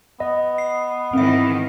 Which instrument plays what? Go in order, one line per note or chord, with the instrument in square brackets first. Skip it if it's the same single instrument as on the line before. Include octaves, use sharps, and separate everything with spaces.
[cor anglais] B3 [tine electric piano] D#5
[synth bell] C7
[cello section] G#2 D#3 E3 [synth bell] C4 E5